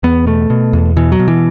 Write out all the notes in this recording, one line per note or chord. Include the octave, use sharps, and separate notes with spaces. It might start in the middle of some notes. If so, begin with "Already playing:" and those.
E2 B3
B2 A3
B2
E2
B2 E3
F#3
B2
E3